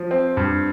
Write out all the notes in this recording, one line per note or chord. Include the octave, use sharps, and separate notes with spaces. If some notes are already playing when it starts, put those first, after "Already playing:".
Already playing: F3
C4
G2